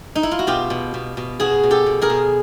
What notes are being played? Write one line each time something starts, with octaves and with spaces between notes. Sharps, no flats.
D#4
E4
F4
F#4
B2 F4 G4
B2
B2
B2
B2 F#4 G#4
B2
G4 A4
B2
G#4 A#4
B2